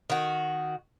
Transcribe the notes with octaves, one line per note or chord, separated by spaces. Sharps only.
D#3 F#4